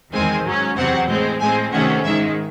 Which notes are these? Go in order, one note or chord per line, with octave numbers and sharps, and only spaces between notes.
E2 D#3 G#3 C4 G#5
G#2 F#3 C#4
E2 C3 F#3 C4 F#5
A2 G#3 C4
A2 G#3 C4 G#5
C3 D#3 A3 C#4 F#5
G#2 D#3 G#3 E5